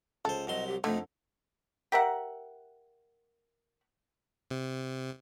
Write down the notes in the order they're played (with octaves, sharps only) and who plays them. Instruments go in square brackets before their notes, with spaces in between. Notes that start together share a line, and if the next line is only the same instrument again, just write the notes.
[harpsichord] C#2 C5 [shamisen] A4
[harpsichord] C2 F#3 C6 [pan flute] D#5
[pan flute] G4
[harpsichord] F2 D#4 [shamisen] D3 [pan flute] A3
[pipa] G4 A#4 E5 F#5
[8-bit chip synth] C3